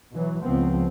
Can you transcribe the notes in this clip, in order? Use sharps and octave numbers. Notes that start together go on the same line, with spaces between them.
B2 E3 F#3
C#2 F3 B3 C4